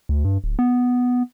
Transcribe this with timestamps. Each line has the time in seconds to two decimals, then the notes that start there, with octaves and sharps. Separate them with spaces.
0.09 D2
0.24 G2
0.44 D1
0.59 B3